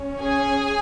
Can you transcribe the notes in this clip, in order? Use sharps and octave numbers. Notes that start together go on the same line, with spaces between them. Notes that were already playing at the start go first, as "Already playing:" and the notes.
Already playing: C#4
G#4 G#5